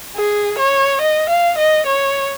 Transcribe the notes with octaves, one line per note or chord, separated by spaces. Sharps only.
G#4
C#5
D#5
F5
D#5
C#5